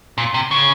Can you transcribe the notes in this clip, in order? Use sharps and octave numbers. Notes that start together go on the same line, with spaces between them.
A#2
C3
C#3